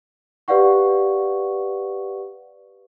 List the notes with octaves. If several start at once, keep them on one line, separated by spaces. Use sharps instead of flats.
G4 B4 D5 F5 F#5 C#6